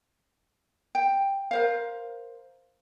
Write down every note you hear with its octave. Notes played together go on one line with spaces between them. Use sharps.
G5
A#4 C5 F5